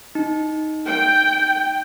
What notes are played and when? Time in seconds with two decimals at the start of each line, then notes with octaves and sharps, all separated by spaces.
0.15 D#4
0.87 G5